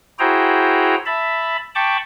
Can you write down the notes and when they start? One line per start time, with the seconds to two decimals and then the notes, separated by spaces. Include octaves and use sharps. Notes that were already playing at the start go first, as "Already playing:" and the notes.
0.19 E4 F#4 G#4 C5 G5 A#5
1.06 E5 A5 B5
1.75 G5 A5 B5 C#6 D6